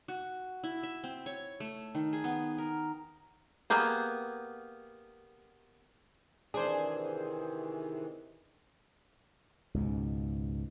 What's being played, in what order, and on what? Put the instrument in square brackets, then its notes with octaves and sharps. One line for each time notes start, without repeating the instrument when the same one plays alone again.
[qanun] F#4
E4
E5
C4
C#5
A3
D#3
G#4
B3
A#4
[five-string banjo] A#3 B3 G4 G#4
[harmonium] C3 D#3 E3 [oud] D4 [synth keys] G#4 C5
[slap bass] C#2 G#2 B2